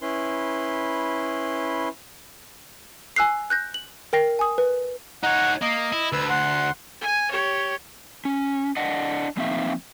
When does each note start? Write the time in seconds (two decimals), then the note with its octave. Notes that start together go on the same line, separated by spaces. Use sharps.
0.02 C#4 E4 B4 C6
3.16 G#5 E6 F#6 C7
3.50 F#6 G6 A#6
3.74 F#7
4.13 A#4 G5 A#6 C7
4.39 G#5 D#6
4.58 B4
5.23 D#4 C#5 F#5
5.62 A#3 D#5
5.92 E4
6.13 D2 B4 E6
6.30 F#5 C6
7.01 G#5
7.31 G4 C#5
8.25 C#4
8.77 D4 D#5 F#5
9.37 F3 A#3 C4 D#4 E5 F5